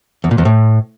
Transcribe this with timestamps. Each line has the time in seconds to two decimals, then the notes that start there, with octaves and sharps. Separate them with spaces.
0.24 E2
0.31 A#2
0.38 E2
0.45 A2